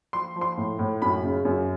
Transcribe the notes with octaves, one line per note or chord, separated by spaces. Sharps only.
F3 C6
F3
C6
A2
A2
F#2 B5
C#3
F#2